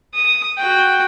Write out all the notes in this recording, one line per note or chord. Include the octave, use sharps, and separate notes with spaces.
D#6
F#4 G5